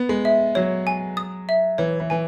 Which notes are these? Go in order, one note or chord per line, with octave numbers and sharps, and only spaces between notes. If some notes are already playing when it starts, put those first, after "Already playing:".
Already playing: B3
G#3
E5
F#3 C#5
G#5
D#6
E5
E3 C#5
E3
E3 G#5